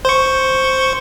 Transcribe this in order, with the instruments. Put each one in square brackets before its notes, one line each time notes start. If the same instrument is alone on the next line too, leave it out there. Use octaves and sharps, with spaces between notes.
[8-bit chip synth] C5 C#6